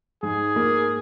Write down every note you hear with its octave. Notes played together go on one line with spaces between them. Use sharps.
G#2 G#4
A#3